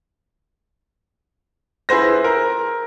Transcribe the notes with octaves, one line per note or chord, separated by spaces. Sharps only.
E4 G#4 B4 C5 A#6
A#4